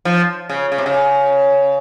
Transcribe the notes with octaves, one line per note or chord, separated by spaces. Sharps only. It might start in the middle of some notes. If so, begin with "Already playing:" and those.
F3
C#3
C#3
C3
C#3